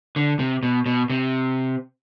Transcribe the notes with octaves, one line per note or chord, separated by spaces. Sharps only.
D3
C3
B2
B2
C3